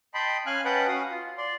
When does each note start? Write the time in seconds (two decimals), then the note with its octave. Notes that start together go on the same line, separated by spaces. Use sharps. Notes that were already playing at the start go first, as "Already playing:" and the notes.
0.14 D#5 G5 A5 B5 C6
0.46 C#4 F5 G#5 F6 F#6
0.65 C#4 B4 D#5 F#5 G5 A5
0.88 C#4 F#4 F5 D#6
1.11 F4
1.38 D5 C6